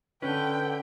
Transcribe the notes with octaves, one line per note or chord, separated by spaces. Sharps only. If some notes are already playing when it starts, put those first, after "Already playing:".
D3 C#4 B4 G5